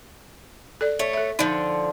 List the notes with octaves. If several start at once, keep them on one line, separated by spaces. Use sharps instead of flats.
A4 D5
A3 C#5
A4 E5
D3 F3 D#4